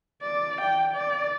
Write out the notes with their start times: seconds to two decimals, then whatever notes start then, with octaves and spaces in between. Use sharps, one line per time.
0.22 D5
0.61 G5
0.94 D5